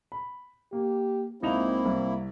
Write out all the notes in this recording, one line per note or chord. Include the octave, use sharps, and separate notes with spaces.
B5
A#3 G4
C#2 A#3 C4 D#4 E4 F7
C2